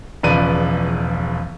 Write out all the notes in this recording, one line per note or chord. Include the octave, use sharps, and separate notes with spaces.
E1 C#2 F3 B4 D5 D#7